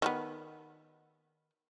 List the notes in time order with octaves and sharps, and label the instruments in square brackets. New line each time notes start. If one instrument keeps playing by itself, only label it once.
[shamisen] D#3 F3 B3